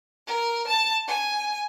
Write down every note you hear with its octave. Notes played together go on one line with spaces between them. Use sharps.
A#4
A5
G#5